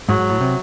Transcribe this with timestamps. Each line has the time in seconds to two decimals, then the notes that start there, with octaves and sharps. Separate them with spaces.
0.09 G#2 F#3
0.19 G#2
0.30 A2
0.41 C3